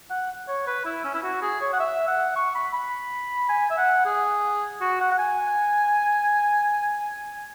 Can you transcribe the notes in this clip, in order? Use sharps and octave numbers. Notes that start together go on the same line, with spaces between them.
F#5
C#5
B4
E4
C#4
E4
F#4
G#4
C#5
F#5
E5
F#5
C#6
B5
B5
G#5
E5
F#5
G#4
F#4
F#5
F#5
G#5